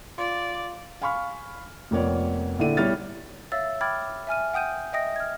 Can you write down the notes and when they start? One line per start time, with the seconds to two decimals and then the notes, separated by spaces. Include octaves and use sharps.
0.18 F4 D5 F5 C6
1.02 F5 G#5 B5 C#6 F6
1.91 F1 F2 A#3 B3 C#5 D5
2.59 A#1 D3 E4 A4 D5 D#7
2.77 B1 G3 E4 C#5 F6 A6
3.52 C#5 E5 F5 E6 A6
3.81 G5 B5 D6 F6 G#6 A6
4.27 E5 G#5 F6 D#7
4.53 F#5 G5 D#6 G6 D#7
4.93 D#5 E5 G5 D#6 A#6
5.16 F6 G#6